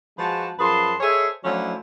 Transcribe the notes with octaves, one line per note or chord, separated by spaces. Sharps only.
F3 G#3 F#4 B4 A5
F#2 F3 G#4 B4 A5 C6
G#4 A4 C5 C#5 D#5 E5
F3 F#3 A3 C#4 D4 E4